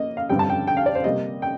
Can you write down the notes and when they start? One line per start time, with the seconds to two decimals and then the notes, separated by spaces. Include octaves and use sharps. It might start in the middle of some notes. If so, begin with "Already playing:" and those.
Already playing: A#3 D#5
0.17 F5
0.29 G2 D3 G3 C4 G5
0.39 A5
0.49 G5
0.67 G5
0.77 F5
0.86 D5
0.95 C5
1.04 C3 G3 A#3 D#5
1.42 G5